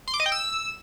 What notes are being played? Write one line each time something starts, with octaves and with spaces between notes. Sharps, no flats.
C6
D6
D#5
G5
E6